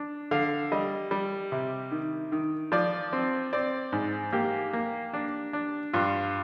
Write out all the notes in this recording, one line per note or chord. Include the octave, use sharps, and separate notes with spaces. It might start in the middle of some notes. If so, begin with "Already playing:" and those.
Already playing: D4
D3 F5
G3 D#5
G3
C3
D#3
D#3
F3 D5
C4
C4 D5
G#2
A#3 G4
A#3
D4
D4
G2 F4